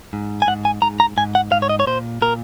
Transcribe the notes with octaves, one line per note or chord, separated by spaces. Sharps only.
G#2
G#5
G#2 F#5
G#5
G#2 A#5
A#5
G#2 G#5
F#5
G#2 F5
C#5
D#5
C#5
A#2 C5
A#2 A#4